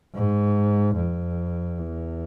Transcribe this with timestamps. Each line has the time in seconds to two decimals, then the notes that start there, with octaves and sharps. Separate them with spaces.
0.15 G#2
0.96 F2
1.78 E2